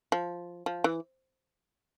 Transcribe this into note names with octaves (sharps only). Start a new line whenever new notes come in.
F3
F3
E3